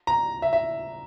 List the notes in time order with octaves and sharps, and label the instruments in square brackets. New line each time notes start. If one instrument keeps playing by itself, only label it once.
[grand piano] A#5
E5
E5